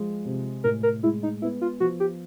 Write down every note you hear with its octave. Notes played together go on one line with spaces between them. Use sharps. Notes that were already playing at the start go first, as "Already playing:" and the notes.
Already playing: F3 G#3
C3
A2 A#4
A#4
G#3 E4
D#4
B3 E4
F4
F3 F#4
G4